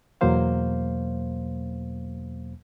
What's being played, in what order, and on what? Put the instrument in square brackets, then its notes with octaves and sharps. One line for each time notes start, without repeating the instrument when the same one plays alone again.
[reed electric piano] E2 B2 F#3 A#3 C5 F5